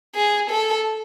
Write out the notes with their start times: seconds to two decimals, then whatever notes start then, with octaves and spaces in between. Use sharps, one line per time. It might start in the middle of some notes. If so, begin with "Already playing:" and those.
0.15 G#4
0.50 A4